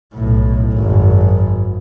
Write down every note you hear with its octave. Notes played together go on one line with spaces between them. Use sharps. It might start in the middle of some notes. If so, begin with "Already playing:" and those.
B1 A2
G#1 F#2